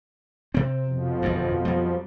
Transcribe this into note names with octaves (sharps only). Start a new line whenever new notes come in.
C3 C4
F2 B2 F3
G1 E2 G2
F#3 G3